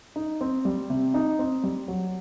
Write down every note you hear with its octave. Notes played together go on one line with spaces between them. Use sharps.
D#4
C4
G3
C3
D#4
C4
G3
F#3